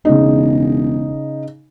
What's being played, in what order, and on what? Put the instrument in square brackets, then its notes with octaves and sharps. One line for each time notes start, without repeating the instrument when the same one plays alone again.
[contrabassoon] E1 [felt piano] C#3 D#4